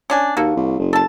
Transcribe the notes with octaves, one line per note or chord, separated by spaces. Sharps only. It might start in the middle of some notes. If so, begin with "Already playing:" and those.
C#4 D4 G#5
D#2 A#3 F#4 A4
C2
F#1
A4 A5